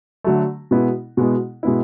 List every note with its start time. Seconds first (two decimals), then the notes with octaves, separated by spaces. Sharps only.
0.24 D3 F#3 A3
0.71 B2 G#3 B3 E4
1.17 B2 G#3 B3 E4
1.63 B2 G#3 B3 E4